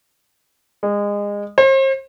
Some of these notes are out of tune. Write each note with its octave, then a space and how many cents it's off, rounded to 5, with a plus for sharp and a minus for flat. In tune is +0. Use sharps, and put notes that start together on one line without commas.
G#3 -25
C5 +40